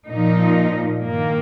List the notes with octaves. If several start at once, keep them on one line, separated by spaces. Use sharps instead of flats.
A#2 F3 D#4
G2 D#3 A#3